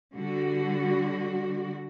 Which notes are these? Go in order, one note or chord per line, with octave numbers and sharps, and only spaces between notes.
D3 G3 F#4